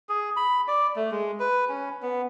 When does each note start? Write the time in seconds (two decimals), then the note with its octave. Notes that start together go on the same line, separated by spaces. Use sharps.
0.09 G#4
0.37 B5
0.68 D5
0.96 A3
1.11 G#3
1.40 B4
1.69 C#4
2.03 B3